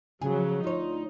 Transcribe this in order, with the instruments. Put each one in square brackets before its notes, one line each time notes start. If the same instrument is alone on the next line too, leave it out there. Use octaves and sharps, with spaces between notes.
[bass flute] C#3 [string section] F3 F#3 [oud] G#4
[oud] D2 C#5 [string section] D#4 [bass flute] F4